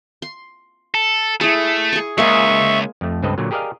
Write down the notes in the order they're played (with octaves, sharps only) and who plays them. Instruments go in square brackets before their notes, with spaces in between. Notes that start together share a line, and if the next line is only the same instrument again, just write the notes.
[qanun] C6
[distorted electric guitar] A4
[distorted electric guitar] A3 [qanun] E4 G#4
[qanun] G#4 C#6
[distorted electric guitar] C#2 G2 [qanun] G#3 A#3 G#4 [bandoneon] E5 C#6
[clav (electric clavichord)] F2 A3
C#2 G2 C4 A4 B4 D#5
A#2 D3 F#3
G4 G#4 A#4 D5 D#5 F5